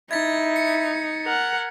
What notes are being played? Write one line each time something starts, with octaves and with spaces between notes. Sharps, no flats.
D#4 E4 G#6 A6 B6
C#7
A#4 F#5